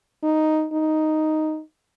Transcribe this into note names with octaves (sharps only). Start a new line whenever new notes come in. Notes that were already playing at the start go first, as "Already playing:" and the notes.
D#4
D#4